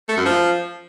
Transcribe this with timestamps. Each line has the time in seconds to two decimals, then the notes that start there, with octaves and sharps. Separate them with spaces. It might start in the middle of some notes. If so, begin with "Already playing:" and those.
0.09 A3
0.17 F#2
0.26 F3